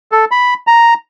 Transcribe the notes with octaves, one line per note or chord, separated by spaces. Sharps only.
A4
B5
A#5